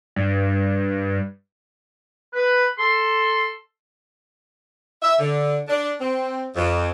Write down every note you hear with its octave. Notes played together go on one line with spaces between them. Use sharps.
G2
B4
A4 C6
E5
D3
D4
C4
F2